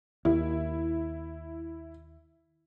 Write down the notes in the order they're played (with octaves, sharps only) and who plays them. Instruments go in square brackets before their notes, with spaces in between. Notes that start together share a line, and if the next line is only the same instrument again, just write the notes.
[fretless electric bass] D#2 [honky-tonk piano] E4